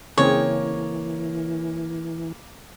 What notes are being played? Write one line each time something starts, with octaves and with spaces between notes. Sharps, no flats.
C#3 E3 A#3 C4 G#4 C#5